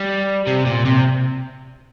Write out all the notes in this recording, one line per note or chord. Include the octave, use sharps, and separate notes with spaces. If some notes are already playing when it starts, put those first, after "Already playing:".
Already playing: G3
C3
A#2
C3